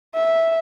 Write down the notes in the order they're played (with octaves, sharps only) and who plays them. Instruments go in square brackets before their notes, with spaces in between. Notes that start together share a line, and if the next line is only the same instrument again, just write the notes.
[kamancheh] E5